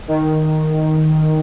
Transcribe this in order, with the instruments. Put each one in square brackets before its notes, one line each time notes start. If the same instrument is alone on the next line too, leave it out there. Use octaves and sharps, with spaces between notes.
[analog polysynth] D#3